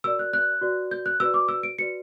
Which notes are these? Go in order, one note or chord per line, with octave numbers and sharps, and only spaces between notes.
F#4 A#4 D5 E6
F#6
F#6
F#4 B4 D5
G6
F#6
F#4 B4 D5 E6
D6
E6
D7
F#4 B4 D5 C#7